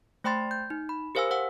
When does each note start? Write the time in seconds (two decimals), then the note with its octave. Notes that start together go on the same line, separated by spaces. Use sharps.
0.24 A3 C5 G5 B5 C6 A6
0.51 G6
0.70 D#4
0.89 B5
1.15 G4 A#4 C5 F5 G#5 E6
1.31 C5 F#5 E6